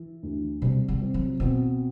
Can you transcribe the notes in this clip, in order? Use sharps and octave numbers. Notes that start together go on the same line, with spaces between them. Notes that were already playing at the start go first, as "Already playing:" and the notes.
Already playing: E3
D2
C3 G3
G3
C4
F#3
B2 C4